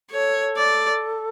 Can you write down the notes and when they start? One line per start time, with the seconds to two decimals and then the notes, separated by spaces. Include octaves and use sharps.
0.10 A4 C#5
0.57 D5